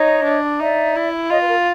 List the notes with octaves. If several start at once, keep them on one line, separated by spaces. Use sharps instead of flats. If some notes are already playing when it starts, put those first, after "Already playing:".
Already playing: D#4 C#5 D#5
D4
D#4 D5 E5
E4
F4 C#5 D#5
B4
A#4